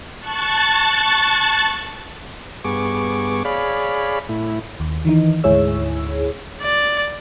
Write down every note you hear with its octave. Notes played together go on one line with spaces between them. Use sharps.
A5 C#6 F#6 A6
G2 B3 G#4 C#6 D6
G#4 C#5 D5 F5 B5
A2 E4
D#2
D#3 E3 D#4
D2 G#2 E4 G#4 C#5 E6
D5